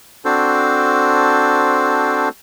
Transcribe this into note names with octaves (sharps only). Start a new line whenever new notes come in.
C4 D4 F#4 A4 C5